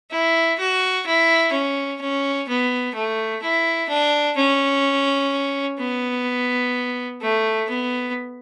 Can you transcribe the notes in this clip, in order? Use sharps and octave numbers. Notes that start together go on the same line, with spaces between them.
E4
F#4
E4
C#4
C#4
B3
A3
E4
D4
C#4
B3
A3
B3